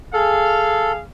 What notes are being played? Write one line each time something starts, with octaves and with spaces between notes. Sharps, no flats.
G#4 A4 F5